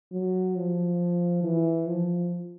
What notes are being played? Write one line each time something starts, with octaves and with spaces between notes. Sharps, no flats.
F#3
F3
E3
F3